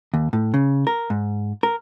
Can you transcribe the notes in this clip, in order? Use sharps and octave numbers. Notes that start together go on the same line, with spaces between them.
D#2
A2
C#3
A#4
G#2
A#4